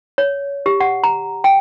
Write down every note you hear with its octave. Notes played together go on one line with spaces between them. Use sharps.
C#5
G4
F#5
A#5
G5